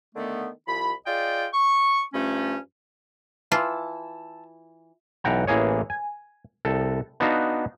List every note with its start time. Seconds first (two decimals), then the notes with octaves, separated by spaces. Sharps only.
0.15 D3 D#3 A3 B3
0.67 C2 F3 B5
1.06 F4 G#4 D5 D#5 G5
1.54 C#6
2.14 G2 F3 A3 C#4
3.52 E3 F4 A5 E6
5.24 B1 E3 F#5 G5 A#5
5.47 A1 E3 A#3 G#4 C#5
5.90 G#5
6.65 C2 A4
7.20 B3 D4 D#4 F#4 F5